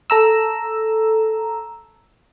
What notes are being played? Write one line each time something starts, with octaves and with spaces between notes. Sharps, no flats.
A4 A#5 E6